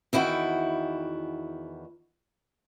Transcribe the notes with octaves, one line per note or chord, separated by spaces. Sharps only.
E2 D#3 E4 F#4 G5